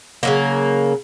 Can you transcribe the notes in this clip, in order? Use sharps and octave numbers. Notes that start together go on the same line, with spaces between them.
C#3 F#3 A#3